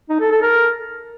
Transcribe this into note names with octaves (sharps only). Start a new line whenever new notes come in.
D#4
A4
A4
A#4